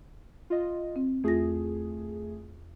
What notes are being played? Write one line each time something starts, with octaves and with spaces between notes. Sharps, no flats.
F4 D#5
C4
E2 A3 F4 G#4 A#6